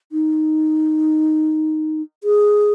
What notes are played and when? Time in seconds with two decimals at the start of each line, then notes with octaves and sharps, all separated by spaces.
0.12 D#4
2.24 G#4